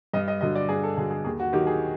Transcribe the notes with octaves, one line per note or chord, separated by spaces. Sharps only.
G2 D#5
D#5
D3 F#3 D#5
D5
G2 G#4
A4
D3 F#3 G#4
G#4
D#2 G#4
F#4
D#3 F#3 G4
G#4